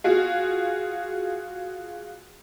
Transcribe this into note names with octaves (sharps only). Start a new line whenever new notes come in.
F4 F#4 G#4